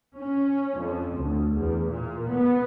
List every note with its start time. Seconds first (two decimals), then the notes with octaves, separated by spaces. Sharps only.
0.16 C#4
0.79 F2
1.18 D2
1.57 E2
1.89 A#2
2.32 B3